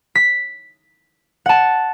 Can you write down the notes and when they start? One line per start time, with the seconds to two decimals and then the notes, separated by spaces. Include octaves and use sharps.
0.15 B6
1.46 F#5 A5